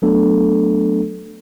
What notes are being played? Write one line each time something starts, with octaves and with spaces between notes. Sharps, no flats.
F#3 A3 B3 D4 A4